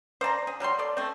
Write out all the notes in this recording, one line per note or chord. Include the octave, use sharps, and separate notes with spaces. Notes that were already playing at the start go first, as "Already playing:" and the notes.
C5 D5 A5 A#5
G#4
F#3 G3 D#4 C6
A4 D5
A3 C4